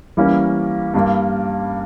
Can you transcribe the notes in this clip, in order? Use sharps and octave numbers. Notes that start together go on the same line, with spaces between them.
E3 G3 A#3 C#4
G2 G3 A#3